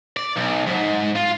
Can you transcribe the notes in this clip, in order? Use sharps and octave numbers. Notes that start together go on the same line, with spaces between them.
D5
B1
G#2
F4